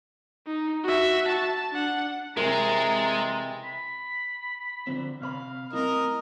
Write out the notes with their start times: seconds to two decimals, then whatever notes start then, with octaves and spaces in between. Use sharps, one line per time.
0.47 D#4
0.84 F#4 E5
1.28 A5
1.72 D4 F#5
2.37 C3 E3 G#3 C4 A#4 A#5 A6
3.64 B5
4.87 D3 F3 C4
5.22 C3 C#5 F5 B5
5.73 A3 C4 E4 A#4 D#5